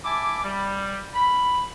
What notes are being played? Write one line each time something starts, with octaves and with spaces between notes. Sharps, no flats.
E4 E5 G#5 A5 D6
G3
B5